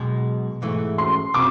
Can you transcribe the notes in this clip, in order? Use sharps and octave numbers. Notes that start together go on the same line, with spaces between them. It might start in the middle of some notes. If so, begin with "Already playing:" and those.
Already playing: B1 B2 G#3
G#2 E3 A3
C6
C3 D6